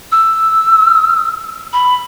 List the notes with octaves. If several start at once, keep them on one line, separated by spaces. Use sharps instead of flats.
E6
B5